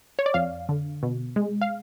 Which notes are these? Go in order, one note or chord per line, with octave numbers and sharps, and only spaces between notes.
C#5
D5
F2 F5
D3
B2
G#3
F5